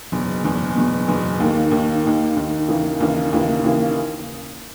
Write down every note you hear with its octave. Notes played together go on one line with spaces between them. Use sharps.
F#1 E2 B2
F#1 E2 B2
F#1 E2 B2
F#1 E2 B2
D#2 D#3 A#3
D#2 D#3 A#3
D#2 D#3 A#3
D#2 D#3 A#3
D#2 C#3 E3 A#3
D#2 C#3 E3 A#3
D#2 C#3 E3 A#3
D#2 C#3 E3 A#3